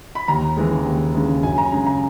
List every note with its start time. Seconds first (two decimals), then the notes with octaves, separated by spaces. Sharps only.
0.15 B5
0.28 D#2 A#5
0.57 C#3 E3 G#3
0.85 D#2
1.14 C#3 E3 G#3
1.43 F#2 G#5
1.58 A#5
1.72 C#3 G#3 A#5
1.87 A#5